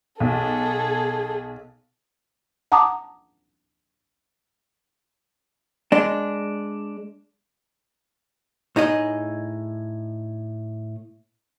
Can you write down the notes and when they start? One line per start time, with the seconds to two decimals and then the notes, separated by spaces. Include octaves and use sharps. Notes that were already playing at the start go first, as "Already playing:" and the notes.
0.20 B1 G#4 A4
2.72 F#5 A5 A#5 D6 D#6
5.92 G#3 D4
8.76 A2 D#4 G#4 D#5